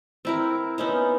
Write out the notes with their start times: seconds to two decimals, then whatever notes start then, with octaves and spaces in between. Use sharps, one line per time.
0.25 C4 E4 A#4
0.78 B3 C#4 D#4 C5